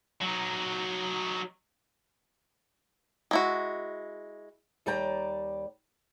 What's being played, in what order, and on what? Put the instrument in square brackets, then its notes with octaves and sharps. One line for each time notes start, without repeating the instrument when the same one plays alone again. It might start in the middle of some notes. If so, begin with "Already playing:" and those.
[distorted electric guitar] F#3 D#4
[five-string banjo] G#3 E4 F#4
[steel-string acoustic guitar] D#2 G3 D5 G5 A#5